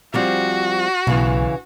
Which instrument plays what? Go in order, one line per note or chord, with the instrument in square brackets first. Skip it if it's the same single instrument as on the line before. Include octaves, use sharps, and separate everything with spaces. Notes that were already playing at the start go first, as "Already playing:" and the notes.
[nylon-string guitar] F3 G3 C4 [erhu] F#4
[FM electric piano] B1 [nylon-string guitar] C#3 E3